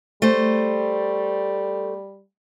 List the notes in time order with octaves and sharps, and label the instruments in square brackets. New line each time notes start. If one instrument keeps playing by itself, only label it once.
[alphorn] G3 [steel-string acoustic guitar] A3 C5